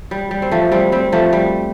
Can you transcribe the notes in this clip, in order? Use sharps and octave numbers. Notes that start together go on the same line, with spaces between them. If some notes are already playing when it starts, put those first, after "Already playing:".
G3
G3
C4
F3 A3
G3 C4
G3 C4
F3 A3
G3